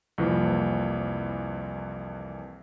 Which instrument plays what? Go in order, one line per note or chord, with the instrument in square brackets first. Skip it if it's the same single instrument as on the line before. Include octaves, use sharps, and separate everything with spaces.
[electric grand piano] C2 F2 E3 F3 A#3